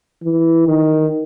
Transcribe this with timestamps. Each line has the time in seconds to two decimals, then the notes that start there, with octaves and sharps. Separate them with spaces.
0.23 E3
0.67 D#3